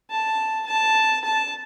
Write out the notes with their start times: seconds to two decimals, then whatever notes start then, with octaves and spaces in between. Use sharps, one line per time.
0.10 A5
0.67 A5
1.24 A5